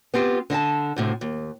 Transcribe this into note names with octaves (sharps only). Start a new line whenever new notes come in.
B3 C4 F4 G4
D3 D#5 F5 A5
D2 A2 C3
D#2